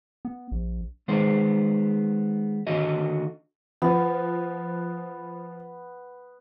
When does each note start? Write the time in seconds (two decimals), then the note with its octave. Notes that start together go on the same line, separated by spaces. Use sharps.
0.25 B3
0.52 A#1
1.08 D#3 G#3 B3 C5
2.67 D3 D#3 F#4 D#5
3.82 F3 B3